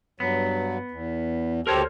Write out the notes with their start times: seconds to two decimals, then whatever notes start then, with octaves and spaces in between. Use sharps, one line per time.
0.20 G2 F#3 B3
0.91 E2
1.67 D2 G4 A4 A#4 C5 C#5